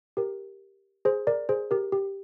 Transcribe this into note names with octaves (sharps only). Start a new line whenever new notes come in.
G4 A#4
G#4 C5
A#4 D5
G#4 C5
G4 A#4
G4